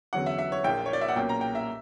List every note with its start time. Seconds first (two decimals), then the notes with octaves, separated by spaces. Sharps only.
0.13 E2 D3 F#3 C#4 F#5
0.26 E5
0.38 E5
0.52 C#5
0.64 A#1 A#2 A#3 G5
0.86 C#5
0.93 D5
1.01 E5
1.08 F#5
1.16 B1 A#2 A#3 C#4 G5
1.29 A#5
1.41 G5
1.55 E5